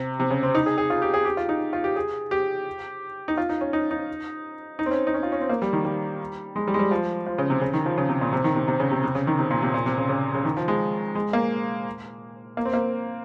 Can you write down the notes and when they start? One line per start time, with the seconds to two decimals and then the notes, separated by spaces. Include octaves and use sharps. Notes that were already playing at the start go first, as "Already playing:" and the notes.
Already playing: C3
0.20 C3
0.31 C#3
0.43 C4
0.55 D#4
0.66 G#4
0.78 G#4
0.90 F4
1.02 G4
1.14 G#4
1.25 G4
1.37 F4
1.49 D#4
1.73 F4
1.84 G4
1.96 G#4
2.31 G4
3.28 D#4
3.37 F4
3.49 D#4
3.61 C#4
3.73 D#4
3.91 D#4
4.79 D#4
4.86 C4
4.91 C#4
5.07 D#4
5.14 C#4
5.23 F4
5.32 C#4
5.41 C4
5.49 A#3
5.62 G3
5.73 D#3
5.85 G3
6.56 G#3
6.68 G3
6.74 G#3
6.79 G3
6.91 F3
7.26 F3
7.38 C#3
7.50 C3
7.61 C#3
7.73 D#3
7.86 F3
7.98 C#3
8.09 C3
8.21 A#2
8.33 C3
8.44 D#3
8.56 C3
8.68 C3
8.80 C#3
8.91 C3
9.03 C3
9.15 C#3
9.27 D#3
9.39 C3
9.51 A#2
9.62 C3
9.74 A#2
9.86 C3
9.97 C#3
10.09 C#3
10.35 C#3
10.45 D#3
10.57 F3
10.68 G#3
11.15 G#3
11.33 A#3
12.57 A#3
12.65 C4
12.73 A#3